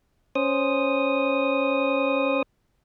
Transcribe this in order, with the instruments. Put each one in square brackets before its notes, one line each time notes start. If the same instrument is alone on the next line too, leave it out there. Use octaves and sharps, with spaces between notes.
[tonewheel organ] C#4 C5 D#6